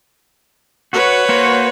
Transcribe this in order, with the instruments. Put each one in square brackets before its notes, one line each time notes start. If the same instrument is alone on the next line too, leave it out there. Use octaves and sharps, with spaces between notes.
[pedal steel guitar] F#4 [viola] B4 C#5
[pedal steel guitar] A#3 F#4 C5